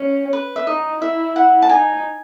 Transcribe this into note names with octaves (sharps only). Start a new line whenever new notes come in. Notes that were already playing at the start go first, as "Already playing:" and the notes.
Already playing: C#4
B4
E5
D#4 D#5
E4 E5
F#5
A5
D#4 G#5